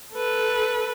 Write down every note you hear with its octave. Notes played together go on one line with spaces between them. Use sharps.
A4 B4